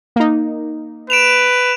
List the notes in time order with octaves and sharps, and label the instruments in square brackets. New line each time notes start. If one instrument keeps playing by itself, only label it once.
[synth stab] A#3 D#4
[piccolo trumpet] B4 [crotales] D7 E7 F7